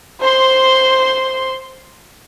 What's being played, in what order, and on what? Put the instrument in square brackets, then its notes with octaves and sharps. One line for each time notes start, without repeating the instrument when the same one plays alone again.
[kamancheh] C5 C6